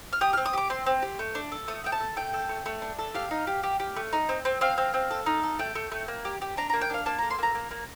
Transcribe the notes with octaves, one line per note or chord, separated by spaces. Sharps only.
F6
G4 D#6
C4 F6
D#6
G4 D6
C4 C6
C4
G4
A3
D4
A4
A3 D#6
A3 G5
A5
A4
A3 G5
A4
A3
A3
D4
A4
G4 F5
D#4
G4
G4
G4
A3
D#4
C4
C4
C4 F5
C4
C4
A4
D#4
A4
A3 G5
A3
A3
A#3
G4
G4
D4 A#5
A#3 A#5
G5
D4 F5
A#3 A5
A4 A#5
C6
A#3 A#5
A#3
A#3